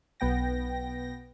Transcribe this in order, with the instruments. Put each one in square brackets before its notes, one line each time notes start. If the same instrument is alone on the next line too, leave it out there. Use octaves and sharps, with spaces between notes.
[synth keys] B1 B3 G5 A#6